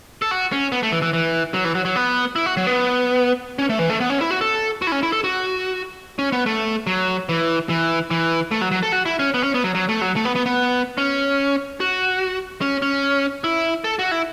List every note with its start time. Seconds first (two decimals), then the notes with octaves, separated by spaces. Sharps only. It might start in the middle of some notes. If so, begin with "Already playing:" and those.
0.22 A4
0.31 F#4
0.52 C#4
0.72 B3
0.83 A3
0.92 E3
1.02 E3
1.13 E3
1.54 F#3
1.64 E3
1.75 F#3
1.85 F#3
1.96 B3
2.36 E4
2.46 F#4
2.57 F#3
2.67 B3
3.59 C#4
3.70 A3
3.79 E3
3.90 A3
4.00 B3
4.10 C#4
4.21 E4
4.31 F#4
4.41 A4
4.82 F#4
4.87 E4
4.92 C#4
5.03 E4
5.12 A4
5.24 F#4
6.19 C#4
6.32 B3
6.46 A3
6.87 F#3
7.29 E3
7.69 E3
8.11 E3
8.51 A3
8.61 F#3
8.71 F#3
8.83 A4
8.92 F#4
9.05 E4
9.19 C#4
9.34 B3
9.43 C#4
9.54 B3
9.64 F#3
9.75 F#3
9.89 A3
10.01 F#3
10.16 A3
10.25 B3
10.35 B3
10.46 B3
10.98 C#4
11.80 F#4
12.61 C#4
12.82 C#4
13.44 E4
13.84 A4
13.99 F#4
14.11 E4